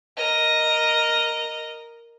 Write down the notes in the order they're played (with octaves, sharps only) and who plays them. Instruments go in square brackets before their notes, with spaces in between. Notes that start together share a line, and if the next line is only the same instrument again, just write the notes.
[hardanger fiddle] A#4 D#5